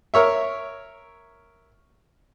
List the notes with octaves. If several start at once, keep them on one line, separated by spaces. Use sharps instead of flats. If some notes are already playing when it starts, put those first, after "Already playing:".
A#4 C#5 E5